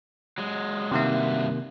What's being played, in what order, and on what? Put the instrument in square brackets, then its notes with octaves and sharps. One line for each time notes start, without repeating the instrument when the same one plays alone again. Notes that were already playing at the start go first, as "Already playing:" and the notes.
[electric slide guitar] F#3 G#3
[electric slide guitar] G2 F#4 E5 [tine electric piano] C3 D#3 A#3